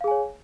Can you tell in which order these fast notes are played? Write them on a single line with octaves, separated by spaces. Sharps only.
F5 G#4 G#5 C#5